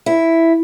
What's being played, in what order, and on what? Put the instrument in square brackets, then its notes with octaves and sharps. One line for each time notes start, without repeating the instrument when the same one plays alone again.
[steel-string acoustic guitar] E4